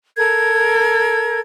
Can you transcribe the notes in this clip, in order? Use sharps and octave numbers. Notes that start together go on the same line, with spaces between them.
A4 A#4 G#6